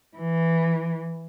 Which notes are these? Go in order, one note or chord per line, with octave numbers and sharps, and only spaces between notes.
E3